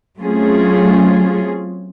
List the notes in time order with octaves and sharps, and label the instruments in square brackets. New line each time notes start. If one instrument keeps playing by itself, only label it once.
[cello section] F#3 A3 C4 C#4 F4 G#4